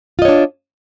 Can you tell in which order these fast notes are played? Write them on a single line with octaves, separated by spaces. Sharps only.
F4 D#5 C#5 D4